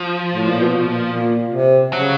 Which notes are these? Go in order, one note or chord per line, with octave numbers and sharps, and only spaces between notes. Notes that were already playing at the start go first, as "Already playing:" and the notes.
Already playing: F3
A2
A#2
B2
A#2
A#2
C3
C#3 F#3